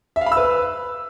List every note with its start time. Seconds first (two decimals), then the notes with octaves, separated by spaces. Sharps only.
0.16 E5
0.21 F5
0.26 B5
0.32 E6
0.37 B4